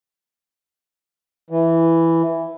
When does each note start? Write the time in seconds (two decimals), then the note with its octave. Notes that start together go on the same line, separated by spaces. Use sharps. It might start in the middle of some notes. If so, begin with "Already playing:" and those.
1.50 E3